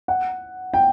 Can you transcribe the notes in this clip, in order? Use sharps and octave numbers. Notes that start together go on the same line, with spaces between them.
F#5
G5